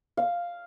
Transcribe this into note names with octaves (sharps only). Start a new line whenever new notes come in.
F5